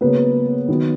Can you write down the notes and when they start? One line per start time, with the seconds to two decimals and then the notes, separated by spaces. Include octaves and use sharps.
0.01 C#3 F#3 A#3 B3 B4
0.68 D#3 F#3 B3